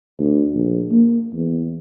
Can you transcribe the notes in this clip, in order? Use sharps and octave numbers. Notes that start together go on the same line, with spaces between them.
D2
A#1
A#3
E2